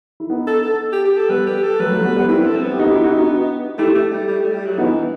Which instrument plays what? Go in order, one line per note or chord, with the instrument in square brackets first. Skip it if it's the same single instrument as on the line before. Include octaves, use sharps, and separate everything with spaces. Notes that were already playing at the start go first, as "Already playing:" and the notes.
[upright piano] E4
B3 D#4
[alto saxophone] A4
A4
G4
G4
A4
[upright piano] G3 B3 [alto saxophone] B4
[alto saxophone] G4
A4
[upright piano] F#3 A3 [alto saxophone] B4
[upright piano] F#3 A3
G3 B3
G3 B3
[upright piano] C4 E4 [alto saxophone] B4
[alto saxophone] A4
C4
B3
[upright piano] G4
D#4 F#4
E4 G4
D#4 F#4
D#4 F#4
[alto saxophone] A3 [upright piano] E4 G4
[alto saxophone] A3
G3
G3
A3
G3
F#3
[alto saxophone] E3 [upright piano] B3 D#4